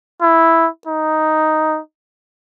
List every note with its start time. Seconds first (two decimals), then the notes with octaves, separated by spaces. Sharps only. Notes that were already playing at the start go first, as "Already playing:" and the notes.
0.21 E4
0.87 D#4